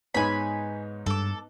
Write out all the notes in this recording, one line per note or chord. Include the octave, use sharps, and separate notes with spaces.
G#2 B3 D#4 C#5 G#5 B5
G2 A4 D6